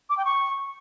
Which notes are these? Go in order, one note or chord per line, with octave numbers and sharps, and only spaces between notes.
D6
G5
C#6